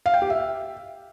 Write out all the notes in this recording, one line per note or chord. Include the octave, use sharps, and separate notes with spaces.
F5
G5
G4
E5